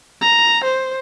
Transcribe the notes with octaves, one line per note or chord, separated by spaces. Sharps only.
A#5
C5